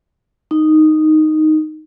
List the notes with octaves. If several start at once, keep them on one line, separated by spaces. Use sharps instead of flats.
D#4